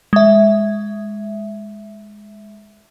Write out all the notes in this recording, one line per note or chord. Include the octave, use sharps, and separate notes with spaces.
G#3 E5